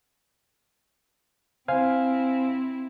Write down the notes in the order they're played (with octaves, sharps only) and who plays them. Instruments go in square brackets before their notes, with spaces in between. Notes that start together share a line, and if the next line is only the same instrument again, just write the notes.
[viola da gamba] C4 E4 [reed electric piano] C5 F5 G#5